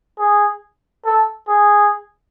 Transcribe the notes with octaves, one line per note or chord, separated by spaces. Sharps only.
G#4
A4
G#4